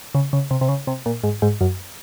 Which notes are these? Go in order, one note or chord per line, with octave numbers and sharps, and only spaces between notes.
C#3
C#3
C3
C3
C#3
C3
A#2
G#2
G#2
F#2